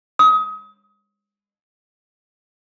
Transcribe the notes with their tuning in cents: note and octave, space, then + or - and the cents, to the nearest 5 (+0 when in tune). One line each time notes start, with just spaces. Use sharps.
D#6 +30